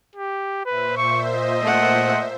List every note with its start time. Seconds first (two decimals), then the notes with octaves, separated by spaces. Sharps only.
0.16 G4
0.66 A#2 B4 C5 E5
0.97 C#6
1.33 D#5
1.62 A3 F#5